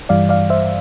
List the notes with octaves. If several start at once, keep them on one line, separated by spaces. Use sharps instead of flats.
G2 E3 G3 D5 F5
D5 F5
C5 E5